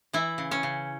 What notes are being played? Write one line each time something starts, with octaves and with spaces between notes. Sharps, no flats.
E3 E4
C#3
C#4
C#3